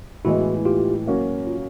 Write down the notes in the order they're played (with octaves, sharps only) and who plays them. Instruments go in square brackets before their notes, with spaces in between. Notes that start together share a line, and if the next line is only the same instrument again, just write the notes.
[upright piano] A2 E3 G#3 B3 [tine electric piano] E4 F#4
[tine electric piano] F4 G4
[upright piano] F#3 A#3 C#4 F#4
[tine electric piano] F4